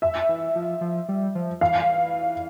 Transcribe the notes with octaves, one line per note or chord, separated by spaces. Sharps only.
E5
E3
F3
F3
G3
F3
E3 F5